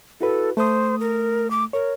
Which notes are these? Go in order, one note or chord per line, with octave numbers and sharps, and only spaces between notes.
E4 F#4 A4 B4
A3 C5 D#6
A#4
D6
A#4 C#5